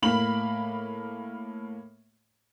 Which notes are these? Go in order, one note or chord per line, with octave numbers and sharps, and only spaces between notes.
A2 A#3 B5 F#7